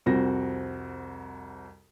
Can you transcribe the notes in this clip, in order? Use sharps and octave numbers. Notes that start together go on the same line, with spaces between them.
C2 F2 C4 F#4 A#6